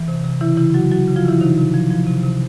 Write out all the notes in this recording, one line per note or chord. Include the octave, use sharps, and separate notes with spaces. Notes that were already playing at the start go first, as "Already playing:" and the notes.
Already playing: E3
C3
C3
C#3 E3 E4
C#3 E3 E4
F#3 F#4
F#3 F#4
C#3
F3 F4
C#3 E3 E4
C3 D#3 D#4
C3
F3
F3
C3
C3